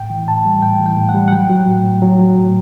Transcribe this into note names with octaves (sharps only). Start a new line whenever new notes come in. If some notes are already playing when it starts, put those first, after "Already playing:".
Already playing: A2 G5
E3
A2 A5
G3
A2 G5
E3
G5
A2
F#5
G3
F#5
F#3 G5
F#3
A2
A2
F#3
F#3
A2